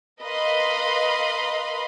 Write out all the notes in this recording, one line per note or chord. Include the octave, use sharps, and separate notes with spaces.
A#4 B4 D#5 F5 B5 C6